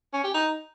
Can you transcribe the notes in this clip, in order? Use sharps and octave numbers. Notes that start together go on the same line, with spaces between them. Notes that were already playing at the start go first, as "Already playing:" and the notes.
C#4
G4
D#4